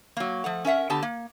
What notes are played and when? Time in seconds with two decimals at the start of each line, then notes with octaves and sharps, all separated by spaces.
0.17 F#3 A#3
0.44 F3 A3 F#5
0.65 C#4 A#4 E5 F#5
0.90 D3 B3 G4 A5
1.03 A#3